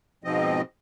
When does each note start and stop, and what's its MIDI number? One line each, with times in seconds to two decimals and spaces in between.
0.24 0.61 44
0.24 0.61 47
0.24 0.61 53
0.24 0.61 60
0.24 0.61 75